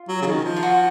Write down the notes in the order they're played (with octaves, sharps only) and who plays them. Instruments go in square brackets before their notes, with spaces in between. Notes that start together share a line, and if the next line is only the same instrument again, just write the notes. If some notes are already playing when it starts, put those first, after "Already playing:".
Already playing: [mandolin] F4
[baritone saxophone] F#3
C#3
D#3
F3
[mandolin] F4
F#4